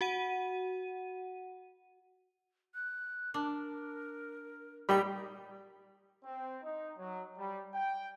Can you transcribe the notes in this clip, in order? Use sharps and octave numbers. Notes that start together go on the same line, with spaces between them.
F#4 F#5 D#7
F#6
D4 A#4
A#2 G3 D#4 D5 G5 A#5 B5
C4
D#4
F#3
G3
G5